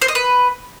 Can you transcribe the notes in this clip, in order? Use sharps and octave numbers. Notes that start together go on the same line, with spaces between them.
C5
D#5
B4